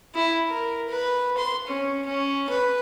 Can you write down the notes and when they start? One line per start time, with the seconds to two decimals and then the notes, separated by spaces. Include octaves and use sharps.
0.15 E4
0.49 A#4
0.89 B4
1.37 C6
1.67 C#4
2.05 C#4
2.49 B4